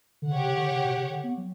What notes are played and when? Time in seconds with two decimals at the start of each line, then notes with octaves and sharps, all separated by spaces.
0.22 D3
0.30 C#3 G4 C#5 F#5
0.44 C#3
0.57 D3
0.71 C#3
0.84 B2
0.97 C#3
1.10 D3
1.24 B3
1.37 F#3